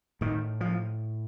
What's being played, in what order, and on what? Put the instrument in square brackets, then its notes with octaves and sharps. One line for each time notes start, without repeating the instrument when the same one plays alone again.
[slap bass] A2 D#3
F3